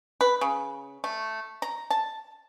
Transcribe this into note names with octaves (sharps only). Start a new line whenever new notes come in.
B4
C#3
A3
A#5
A5